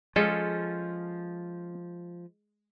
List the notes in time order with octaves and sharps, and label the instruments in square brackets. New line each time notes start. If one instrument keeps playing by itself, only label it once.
[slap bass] F3 [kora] G#3 [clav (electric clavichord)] C#4 F4 A4